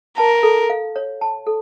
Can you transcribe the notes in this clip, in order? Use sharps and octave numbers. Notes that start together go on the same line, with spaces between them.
A#4 A5
A4
F5
C#5
A5
A4